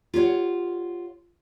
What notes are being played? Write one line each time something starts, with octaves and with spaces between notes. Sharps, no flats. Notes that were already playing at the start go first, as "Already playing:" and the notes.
F4 G4 C#5 F#5